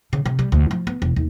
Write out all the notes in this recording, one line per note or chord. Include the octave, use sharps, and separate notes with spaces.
C#3
C3
G3
D2
F3
B3
E1
D#2